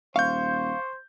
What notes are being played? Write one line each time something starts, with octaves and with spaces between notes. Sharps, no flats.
D#1 C5 F5 C#6 G6